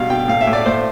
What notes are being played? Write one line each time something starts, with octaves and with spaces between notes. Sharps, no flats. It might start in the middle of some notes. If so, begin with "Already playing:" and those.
Already playing: G2 B2 F5
B2 G5
A2 F5
E5
A2
D5
A2 C5